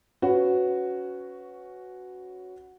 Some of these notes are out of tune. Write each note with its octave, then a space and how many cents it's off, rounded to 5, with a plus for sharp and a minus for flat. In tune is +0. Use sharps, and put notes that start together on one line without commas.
C#4 +15 F#4 +0 B4 +20